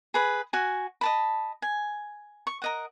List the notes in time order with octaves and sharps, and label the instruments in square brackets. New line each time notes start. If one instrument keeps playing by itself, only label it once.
[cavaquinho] G#4 B4 B5
F#4 G#5
D#5 A5 B5
G#5
C#6
A#4 D#5 F#5